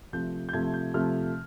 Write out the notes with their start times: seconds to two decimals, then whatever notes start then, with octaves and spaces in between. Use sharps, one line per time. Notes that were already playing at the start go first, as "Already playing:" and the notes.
0.13 C3 F3 A3 G6
0.49 G6
0.53 C3 F3 A3 G#6
0.74 G6
0.94 C3 F3 A3 F6